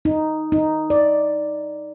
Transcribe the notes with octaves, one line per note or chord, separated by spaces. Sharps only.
D#4
D#4
D5